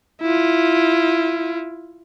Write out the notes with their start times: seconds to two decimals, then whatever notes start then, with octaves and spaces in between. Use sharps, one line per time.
0.21 E4 F4